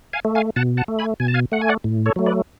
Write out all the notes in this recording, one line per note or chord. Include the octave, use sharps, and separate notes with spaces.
F5 G#5
A3
F5 G#5
B2 F#5 A5
F#5 A5
A3
G#5 B5
B2 G#5
A5
F5 G#5
A3 F#5
G#5
D5 F#5
A2
A4 C#5
F#3 A3
B4 D5